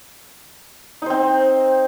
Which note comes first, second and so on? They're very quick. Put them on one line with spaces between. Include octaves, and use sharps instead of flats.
D#4 C5 C4